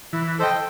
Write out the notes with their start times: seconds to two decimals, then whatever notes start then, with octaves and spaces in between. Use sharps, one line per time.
0.13 E3 E4
0.39 A4 C5 D#5 G5